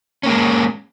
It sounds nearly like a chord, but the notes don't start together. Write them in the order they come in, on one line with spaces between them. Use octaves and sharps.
C#4 A#3 G#3